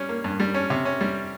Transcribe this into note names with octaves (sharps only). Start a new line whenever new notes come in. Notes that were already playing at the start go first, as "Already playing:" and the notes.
Already playing: G3 C#4
A#3
G2
G3
C#4
C3
C#4
G3